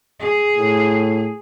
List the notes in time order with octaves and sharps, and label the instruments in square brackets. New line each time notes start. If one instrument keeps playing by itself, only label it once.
[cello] G#4
[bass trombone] A2